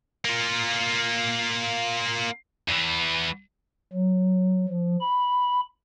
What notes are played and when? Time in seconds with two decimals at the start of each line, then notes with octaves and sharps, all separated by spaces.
0.25 A#3 F4
2.69 E2 E3
3.93 F#3
4.69 F3
5.00 B5